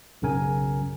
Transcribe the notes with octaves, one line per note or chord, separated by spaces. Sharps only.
B1 F#2 C#3 A#4 G#5